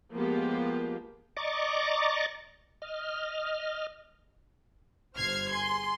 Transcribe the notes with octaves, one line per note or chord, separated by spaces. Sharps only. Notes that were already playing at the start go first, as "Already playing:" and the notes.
F3 G#3 A#3 B3 F4 G4
D5 D#5 A#5 C#6 D6 A6
D#5 F6
G1 C5 F6 G#6 C7
G#4 C6